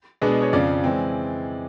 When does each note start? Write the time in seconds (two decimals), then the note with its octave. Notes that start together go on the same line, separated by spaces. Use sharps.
0.22 B2 G#3 B3 D4 G#4
0.42 C#5
0.53 F2 C#3 F3 D5
0.84 E3 G#3 C4